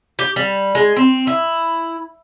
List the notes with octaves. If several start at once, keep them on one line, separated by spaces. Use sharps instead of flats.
G4
G3
G#3
C4
E4